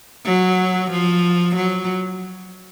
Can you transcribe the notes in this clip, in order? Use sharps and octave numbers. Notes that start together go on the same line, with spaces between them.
F#3
F3
F#3